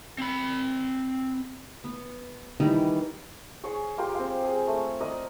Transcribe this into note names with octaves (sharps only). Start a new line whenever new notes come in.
C4 B5
B3
D#3 E3 G3 D#4
G#4 C#5
G#3 F4 G4 A#4
C4 F5
G#4
A3
A#4 D5 D#5